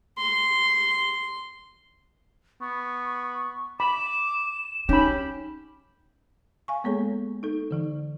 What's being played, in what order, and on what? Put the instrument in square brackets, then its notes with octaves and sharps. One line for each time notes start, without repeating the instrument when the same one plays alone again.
[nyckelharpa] C6
[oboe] B3 [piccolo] C#6
[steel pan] B5 [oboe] D6 [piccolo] E7
[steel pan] C#4 B5 [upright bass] D#4 [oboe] G4
[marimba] F5 G#5 C#6
G#3 A#3 B3 G#4 A4 C#5
D#4 A4
D3 E3 D#4